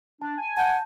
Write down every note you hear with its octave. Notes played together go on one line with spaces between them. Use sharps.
D4 A5
G#5
F#5 A5 G6